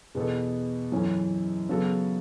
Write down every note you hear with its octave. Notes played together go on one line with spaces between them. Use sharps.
E2 B2 B3 A4
F#2 E3 C#4 A4
C#3 F#3 B3 F#4 A4